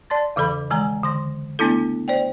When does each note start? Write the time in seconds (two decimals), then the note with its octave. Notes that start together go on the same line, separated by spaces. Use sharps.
0.10 D5 A5 C6 A6
0.36 E2 C#3 E3 A4 B5
0.70 D#3 E3 G#3 G#5 A#5
1.03 D3 C6 A#6
1.59 A3 B3 D4 E4 A4
2.08 C5 D5 G5